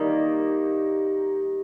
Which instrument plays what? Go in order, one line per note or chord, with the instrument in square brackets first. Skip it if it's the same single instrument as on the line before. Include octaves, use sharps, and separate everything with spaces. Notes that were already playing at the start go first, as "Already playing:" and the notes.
Already playing: [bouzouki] D#3 G3 A#3 [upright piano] D#4